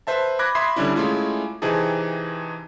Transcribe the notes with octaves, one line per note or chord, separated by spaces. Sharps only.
B4 C5 E5 A5
B5 D6 F#6 G#6 A#6
E5 B5 C6 D#6 G#6 C7
D3 G3 C#4 D4 E4
G#3 A3 C#4 E4 F4
C3 E3 C4 D#4 G#4 A5